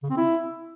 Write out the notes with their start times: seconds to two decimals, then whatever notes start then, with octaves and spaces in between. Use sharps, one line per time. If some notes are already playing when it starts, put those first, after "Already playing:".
0.03 C#3
0.10 C4
0.17 E4